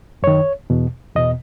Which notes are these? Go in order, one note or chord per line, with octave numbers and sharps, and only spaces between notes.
F#2 D#3 C#5
E2 B2
E2 B2 D#5